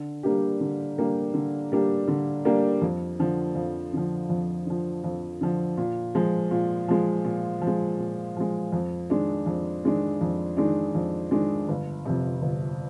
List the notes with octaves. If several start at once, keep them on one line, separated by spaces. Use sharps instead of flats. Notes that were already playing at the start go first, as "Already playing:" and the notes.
Already playing: D3
G3 A#3 D4 G4
D3
G3 A#3 D4 G4
D3
G3 A#3 D4 G4
D3
G3 A#3 D4 G4
F2
D3 F3
F2
D3 F3
F2
D3 F3
F2
D3 F3
A#2
F3 G#3
A#2
F3 G#3
A#2
F3
G#3
A#2
F3 G#3
F2
D#3 G#3 D4
F2
D#3 G#3 D4
F2
D#3 G#3 D4
F2
D#3 G#3 D4
G1
F2 C3
G1